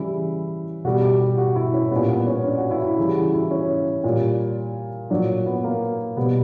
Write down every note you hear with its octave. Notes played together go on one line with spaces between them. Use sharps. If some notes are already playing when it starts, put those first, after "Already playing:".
Already playing: C#3 E3 G3 E4
B2 G3 F#4
G4
G4
F#4
E4
C#4
A#2 G3 B3
B3
C#4
D4
F#4
E4
E4
C#3 E3 G3 E4
F#4
E4
C#4
A#2 G3
A#2 F#3 D4
B3
A#3
B2 G3 B3